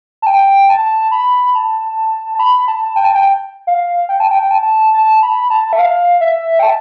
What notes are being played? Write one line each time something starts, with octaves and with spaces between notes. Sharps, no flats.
A5
G5
A5
B5
A5
A5
B5
A5
G5
A5
G5
F5
G5
A5
G5
A5
A5
B5
A5
E5
F5
E5
G5
A5